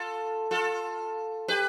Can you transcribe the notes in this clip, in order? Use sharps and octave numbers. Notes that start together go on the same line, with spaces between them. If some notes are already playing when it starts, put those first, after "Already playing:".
Already playing: F4 A4
F4 A4
G4 B4